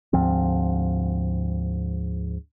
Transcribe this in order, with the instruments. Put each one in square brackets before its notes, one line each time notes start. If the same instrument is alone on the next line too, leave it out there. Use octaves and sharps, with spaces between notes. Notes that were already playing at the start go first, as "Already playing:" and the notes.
[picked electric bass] D2 G#2 F3 C4